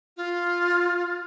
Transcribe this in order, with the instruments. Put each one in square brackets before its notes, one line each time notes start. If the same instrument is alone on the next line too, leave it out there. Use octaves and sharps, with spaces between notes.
[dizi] F4